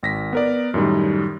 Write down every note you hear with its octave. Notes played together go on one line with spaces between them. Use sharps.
G#1 A#6 B6
B3 A#4 D5
F#2 A2 D#3 G3